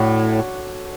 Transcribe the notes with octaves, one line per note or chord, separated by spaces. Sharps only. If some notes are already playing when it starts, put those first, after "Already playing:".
Already playing: A2 D4 F#4 A4 C#5